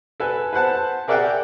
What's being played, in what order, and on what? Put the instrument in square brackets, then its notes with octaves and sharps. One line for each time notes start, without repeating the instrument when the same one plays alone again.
[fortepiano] A4 B4 G#5
B4 C5 F#5 A5
G#4 A#4 D5 E5 F#5 G5